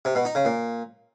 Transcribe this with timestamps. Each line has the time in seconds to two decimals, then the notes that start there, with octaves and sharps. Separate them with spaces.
0.05 C3
0.15 B2
0.25 D#4
0.35 C#3
0.45 A#2